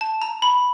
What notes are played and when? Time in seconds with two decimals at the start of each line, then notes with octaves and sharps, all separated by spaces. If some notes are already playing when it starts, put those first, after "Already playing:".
0.01 A5
0.22 A#5
0.42 B5